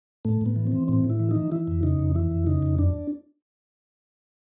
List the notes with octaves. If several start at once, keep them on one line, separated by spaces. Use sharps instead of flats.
A2 A3
A2 B3
E3
C4
E3
A2 C4
A2
E4
E3
E3 D#4
E3 E4
F2
C#3 D#4
F2
E3 E4
F2
C#3 D#4
F2
F#2 D4